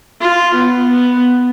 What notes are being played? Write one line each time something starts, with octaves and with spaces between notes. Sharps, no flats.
F4
B3
B3